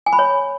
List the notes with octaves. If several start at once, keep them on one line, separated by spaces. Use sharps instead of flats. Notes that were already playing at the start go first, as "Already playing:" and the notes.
G#5
B5
C#5